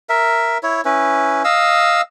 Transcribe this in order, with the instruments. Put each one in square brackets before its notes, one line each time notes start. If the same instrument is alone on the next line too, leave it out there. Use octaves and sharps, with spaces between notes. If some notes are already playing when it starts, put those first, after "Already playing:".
[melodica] A#4 E5
E4 C#5
C#4 E4 B4
D#5 F5 E6